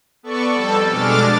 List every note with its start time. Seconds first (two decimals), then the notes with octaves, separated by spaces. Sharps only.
0.23 B3 A4 D5 C#6
0.53 F2 G3 A4
0.89 B2 G#3 D4 D6 F6 A6